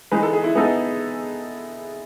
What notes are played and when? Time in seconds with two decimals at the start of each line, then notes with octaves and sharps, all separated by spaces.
0.11 E3 G#3 D#4 B4
0.23 A4
0.33 G#4
0.44 E4
0.55 G#3 B3 D#4 A4